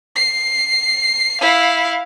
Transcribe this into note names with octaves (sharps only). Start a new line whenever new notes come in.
C7
E4 F5